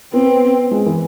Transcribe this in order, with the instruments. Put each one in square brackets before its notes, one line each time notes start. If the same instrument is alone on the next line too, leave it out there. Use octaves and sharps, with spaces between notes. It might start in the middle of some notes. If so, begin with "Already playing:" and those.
[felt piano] B3 [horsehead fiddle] C4
[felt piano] G#3
E3